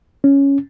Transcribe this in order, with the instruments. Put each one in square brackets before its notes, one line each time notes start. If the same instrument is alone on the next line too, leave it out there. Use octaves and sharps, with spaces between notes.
[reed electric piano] C#4